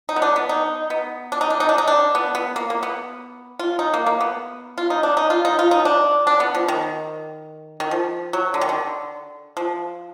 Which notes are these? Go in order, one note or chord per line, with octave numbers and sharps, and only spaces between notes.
D#4
B3
D4
B3
D#4
B3
D4
D#4
D4
D#4
D4
D#4
D4
B3
B3
A#3
A#3
B3
F4
D#4
A#3
A#3
B3
F4
D#4
D4
D#4
F4
D#4
F4
D#4
D4
D4
B3
F3
D#3
D#3
F3
F#3
D3
D#3
D3
F3